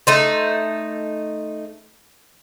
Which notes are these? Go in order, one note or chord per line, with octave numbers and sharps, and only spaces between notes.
A3 D#4 C5